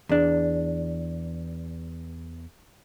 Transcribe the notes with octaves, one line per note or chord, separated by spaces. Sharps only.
E2 D4